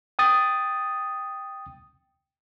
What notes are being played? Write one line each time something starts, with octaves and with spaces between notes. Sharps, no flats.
G5 D#6 A6